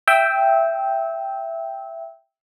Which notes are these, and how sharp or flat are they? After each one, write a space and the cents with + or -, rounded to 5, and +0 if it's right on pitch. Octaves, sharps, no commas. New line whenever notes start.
E5 +10 G5 +0 E6 -25